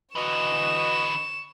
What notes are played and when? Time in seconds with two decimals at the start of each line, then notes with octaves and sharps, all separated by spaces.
0.15 D3 E3 F#4 B4 D#5 C#6 E7